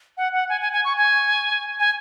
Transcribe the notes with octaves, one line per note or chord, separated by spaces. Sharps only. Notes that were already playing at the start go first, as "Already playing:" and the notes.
F#5
F#5
G#5
G#5
G#5
C#6
G#5
G#5